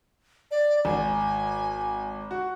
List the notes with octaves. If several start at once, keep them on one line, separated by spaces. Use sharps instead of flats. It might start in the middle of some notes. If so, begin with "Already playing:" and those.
D5
G#1 G#5
F#4